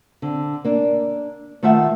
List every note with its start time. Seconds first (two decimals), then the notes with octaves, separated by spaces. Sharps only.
0.22 D3 C4
0.64 A#3 D4
1.63 D#3 A3 F4 E5 F#5